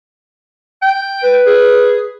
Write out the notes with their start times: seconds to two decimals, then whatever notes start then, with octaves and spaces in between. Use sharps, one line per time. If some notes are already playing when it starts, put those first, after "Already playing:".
0.82 G5
1.23 B4
1.46 G#4